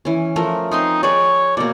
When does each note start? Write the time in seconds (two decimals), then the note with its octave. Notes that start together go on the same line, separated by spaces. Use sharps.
0.05 E3 C#4
0.36 F3 A3 A#4
0.71 C4 D#4 G#5 C6
1.03 G#4 B4 C#5 D5
1.57 B2 A#3 D5